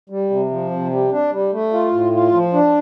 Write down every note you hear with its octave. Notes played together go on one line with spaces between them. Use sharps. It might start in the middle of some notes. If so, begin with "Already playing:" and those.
G3
C3
F3
C3
G3
D4
G3
A3
F4
A2
F4
F3
D4